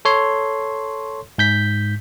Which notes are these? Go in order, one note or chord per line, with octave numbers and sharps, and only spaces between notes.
A4 C#5 C6
G#2 G6 B6